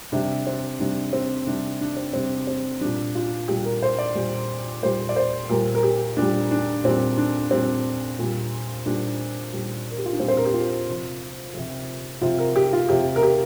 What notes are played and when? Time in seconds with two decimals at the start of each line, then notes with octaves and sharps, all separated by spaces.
0.12 C3 G3 D4
0.47 C4
0.79 C3 G3 D4
1.13 C4
1.47 C3 G3 D4
1.81 D4
1.97 C4
2.13 C3 G3 C4
2.47 C4
2.81 A#2 G3 D4
3.15 F4
3.48 A#2 G3 G4
3.65 A#4
3.83 C5
3.99 D5
4.15 A#2 G3
4.82 A#2 G3 C5
5.09 D5
5.16 C5
5.49 A#2 G3 A#4
5.75 A#4
5.83 G4
6.17 A#2 G3 D4
6.51 D4
6.84 A#2 G3 C4
7.18 D4
7.51 A#2 G3 C4
8.19 A#2 G3
8.86 A#2 G3 D4
9.53 A#2 G3
9.91 A#4
9.98 G4
10.06 F4
10.13 D4
10.20 A#2 G3 C4
10.28 C5
10.37 A#4
10.45 G4
10.54 F4
10.87 C3 F3
11.54 C3 F3
12.21 C3 F3 F4
12.39 A#4
12.56 G4
12.73 F4
12.89 C3 F3 G4
13.16 A#4
13.23 G4